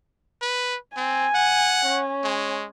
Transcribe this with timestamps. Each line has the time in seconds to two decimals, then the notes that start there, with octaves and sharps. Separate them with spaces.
0.41 B4
0.97 C4 G#5
1.35 F#5
1.86 C#4
2.24 G#3